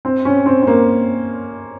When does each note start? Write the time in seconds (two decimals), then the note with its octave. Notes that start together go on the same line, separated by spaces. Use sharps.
0.05 C4
0.25 C#4
0.46 C4
0.62 C4
0.67 A#3